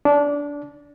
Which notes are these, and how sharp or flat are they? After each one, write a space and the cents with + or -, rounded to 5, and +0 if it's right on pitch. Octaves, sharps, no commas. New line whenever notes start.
D4 -20